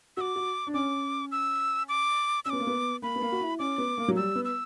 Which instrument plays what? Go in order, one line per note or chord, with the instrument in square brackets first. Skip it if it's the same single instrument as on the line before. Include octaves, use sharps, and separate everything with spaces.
[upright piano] F#4 [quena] D6 E6
[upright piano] F#4
D4
[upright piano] C#4 [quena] D6
[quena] E6
D6
[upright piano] C#4 [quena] E6
[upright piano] B3 [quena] D6
[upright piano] A#3
B3
[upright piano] A#3 [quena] B5
[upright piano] B3
A#3
F#4
E4
[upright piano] C#4 [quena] D6
[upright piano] B3
A#3
F#3
[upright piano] G3 [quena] E6
[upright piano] B3
[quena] E6